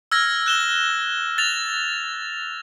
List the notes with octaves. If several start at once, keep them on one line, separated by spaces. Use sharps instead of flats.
E6 F6 G#6 A#6
F#6 E7 G7
A6 F7